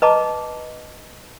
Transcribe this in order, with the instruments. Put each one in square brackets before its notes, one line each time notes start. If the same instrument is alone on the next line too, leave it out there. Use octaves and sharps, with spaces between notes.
[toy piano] B4 D#5 A5 A#5 D6